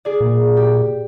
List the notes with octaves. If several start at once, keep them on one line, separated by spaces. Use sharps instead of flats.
G#4 D5
A#2
G4